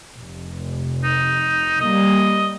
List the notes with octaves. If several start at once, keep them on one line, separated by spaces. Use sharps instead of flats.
F1
D#4
G3 A#3 D#5